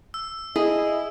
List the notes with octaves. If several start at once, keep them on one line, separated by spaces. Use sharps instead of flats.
E6
E4 G#4 D#5